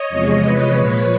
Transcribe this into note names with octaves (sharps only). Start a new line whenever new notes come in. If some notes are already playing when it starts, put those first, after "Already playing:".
Already playing: C#5 D#5
E2 C3 F3 G#3
B4 C#5
A#2 F3 G#3